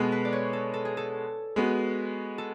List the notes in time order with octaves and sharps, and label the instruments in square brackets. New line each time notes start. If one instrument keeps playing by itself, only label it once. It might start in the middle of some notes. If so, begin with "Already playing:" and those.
Already playing: [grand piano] B2 G#3 B3 [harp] A4
[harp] B4
D5
C#5
A4
A4
G#4
A4
[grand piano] G#3 B3 F#4
[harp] A4